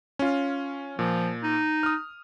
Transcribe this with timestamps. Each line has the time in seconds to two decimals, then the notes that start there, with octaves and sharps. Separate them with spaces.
0.19 C#4 F4
0.99 A#2 F3
1.43 D#4
1.83 D#6 F6